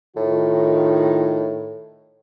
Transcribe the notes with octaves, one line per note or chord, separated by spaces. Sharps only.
A2 D#3 F4